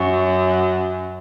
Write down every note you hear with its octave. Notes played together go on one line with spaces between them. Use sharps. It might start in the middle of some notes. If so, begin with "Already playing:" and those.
Already playing: F#2